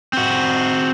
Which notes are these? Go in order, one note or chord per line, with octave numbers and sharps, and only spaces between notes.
C4 F#4